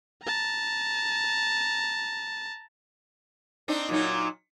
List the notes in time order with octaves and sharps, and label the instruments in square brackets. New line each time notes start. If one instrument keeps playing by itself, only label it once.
[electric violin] A5 A#5
[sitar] C4 D4 D#4
A#2 F#3 D#4